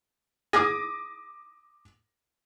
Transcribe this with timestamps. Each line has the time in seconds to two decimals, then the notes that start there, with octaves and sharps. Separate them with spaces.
0.53 G#4 D6 D#6 A#6